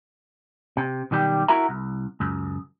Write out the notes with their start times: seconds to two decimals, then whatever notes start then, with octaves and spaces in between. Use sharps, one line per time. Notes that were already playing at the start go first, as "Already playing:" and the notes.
0.77 C3
1.11 B1 D#3 G3 G4
1.48 E4 F#4 A#4 E5 A#5
1.69 C2
2.20 C#2 F#2